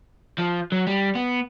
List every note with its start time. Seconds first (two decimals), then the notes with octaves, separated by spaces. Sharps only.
0.38 F3
0.72 F#3
0.87 G3
1.15 B3